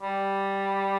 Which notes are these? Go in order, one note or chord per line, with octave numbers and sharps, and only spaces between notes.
G3